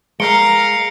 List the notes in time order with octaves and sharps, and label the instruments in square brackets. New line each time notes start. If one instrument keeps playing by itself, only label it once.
[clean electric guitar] G#3 A#4 [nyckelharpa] F5 A#5 [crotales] C#7 D7 G7